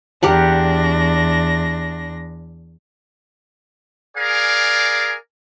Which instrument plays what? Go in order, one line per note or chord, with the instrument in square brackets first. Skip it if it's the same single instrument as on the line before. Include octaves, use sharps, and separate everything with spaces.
[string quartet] E2 D4 A#6 [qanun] G4 A#4 F#5
[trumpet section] G#4 A#4 D5 F5 G#5